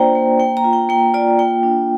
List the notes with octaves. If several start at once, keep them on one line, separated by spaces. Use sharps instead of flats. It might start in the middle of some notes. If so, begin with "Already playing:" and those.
Already playing: A#3 D4 F4 C5 D5 G5 A#5
A#3
A#3 G5
A#5
F4
G5
A#3 G5
F4 D5
A#3 G5
D4